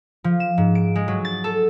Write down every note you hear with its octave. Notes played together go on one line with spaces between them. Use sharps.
F3
E7
G#2
D7
G#3
F#3
A6
A4